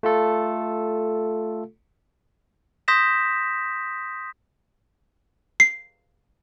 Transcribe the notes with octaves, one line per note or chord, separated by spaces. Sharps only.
A3 F4 A4
C6 D#6 G6 A#6 B6 E7
C7